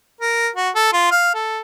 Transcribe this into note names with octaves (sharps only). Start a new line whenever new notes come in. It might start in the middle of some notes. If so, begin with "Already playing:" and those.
A#4
F#4
A4
F4
F5
A4